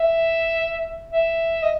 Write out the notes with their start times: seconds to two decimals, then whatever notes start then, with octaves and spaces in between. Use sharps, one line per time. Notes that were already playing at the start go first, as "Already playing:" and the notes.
Already playing: E5
1.11 E5
1.62 D#5